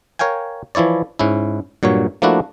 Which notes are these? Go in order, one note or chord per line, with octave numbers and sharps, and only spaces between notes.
A#4 C#5 F5 G5 G#5
E3 F3 E4 C#5 D5
G#2 C#4 E4
G2 A#2 F#3 C#5
F3 A3 A#3 D4 E4 F#4